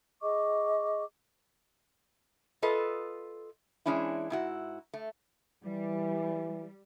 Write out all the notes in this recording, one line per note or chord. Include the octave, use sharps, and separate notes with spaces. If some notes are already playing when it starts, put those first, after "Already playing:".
G#4 D#5 C#6 D6
F4 A4 B4 D#5
E3 G#3 C#4 D4 E4
G#2 E4 F#4
A3
E3 G3